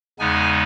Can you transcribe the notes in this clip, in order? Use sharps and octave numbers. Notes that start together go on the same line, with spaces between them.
E2 C#3 G#3 B3 D#4 G#5